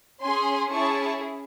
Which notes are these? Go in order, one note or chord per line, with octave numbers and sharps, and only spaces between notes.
C#4 G#4 G#5 C6
C#4 E4 G#4 A5 C#6